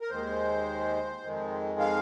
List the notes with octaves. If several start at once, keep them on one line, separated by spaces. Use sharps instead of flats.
A#4
D#2 D#3 G#3 C5
F2 D#3 G#3
F5